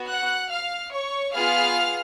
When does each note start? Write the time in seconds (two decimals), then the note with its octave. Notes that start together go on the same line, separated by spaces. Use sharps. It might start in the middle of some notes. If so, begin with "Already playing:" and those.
Already playing: B3 F#4
0.09 F#5 F#6
0.51 F5 F6
0.93 C#5 C#6
1.34 B3 F4 G#4 F5 F6